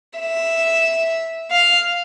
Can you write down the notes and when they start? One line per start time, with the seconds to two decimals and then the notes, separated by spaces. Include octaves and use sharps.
0.19 E5
1.51 F5